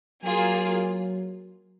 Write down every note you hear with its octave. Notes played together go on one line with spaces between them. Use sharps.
F#3 A#3 F4 G#4